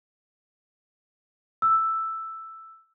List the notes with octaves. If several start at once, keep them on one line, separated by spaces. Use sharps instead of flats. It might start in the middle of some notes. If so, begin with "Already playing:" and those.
E6